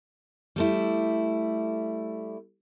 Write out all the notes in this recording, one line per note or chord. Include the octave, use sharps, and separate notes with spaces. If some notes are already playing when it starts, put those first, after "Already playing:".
G3 A3 E4